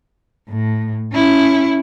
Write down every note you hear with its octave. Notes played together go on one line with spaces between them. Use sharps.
A2
C#4 E4